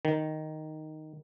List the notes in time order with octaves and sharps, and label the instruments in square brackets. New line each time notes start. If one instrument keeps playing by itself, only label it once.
[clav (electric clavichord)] D#3